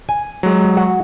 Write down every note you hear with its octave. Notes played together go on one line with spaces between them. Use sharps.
G#5
F#3 G#3
F#4